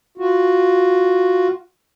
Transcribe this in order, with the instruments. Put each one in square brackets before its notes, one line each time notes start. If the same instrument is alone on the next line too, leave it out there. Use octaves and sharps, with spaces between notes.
[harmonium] F4 F#4